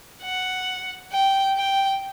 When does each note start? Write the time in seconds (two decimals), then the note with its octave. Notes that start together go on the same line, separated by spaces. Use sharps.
0.23 F#5
1.12 G5
1.57 G5